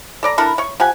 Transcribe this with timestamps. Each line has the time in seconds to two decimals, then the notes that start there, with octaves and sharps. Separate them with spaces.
0.23 A4 D5 A#5
0.38 D4 E4 A4 A#4
0.58 C#5 C#6
0.80 F3 G4 F#5 G#5